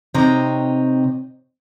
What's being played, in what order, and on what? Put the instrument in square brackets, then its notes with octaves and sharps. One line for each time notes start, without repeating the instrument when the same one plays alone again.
[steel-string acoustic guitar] C3 C4 D#4 C#5